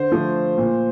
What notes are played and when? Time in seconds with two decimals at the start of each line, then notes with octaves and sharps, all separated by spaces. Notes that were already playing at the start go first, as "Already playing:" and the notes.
Already playing: D3 C5
0.12 F3 A3
0.58 A#2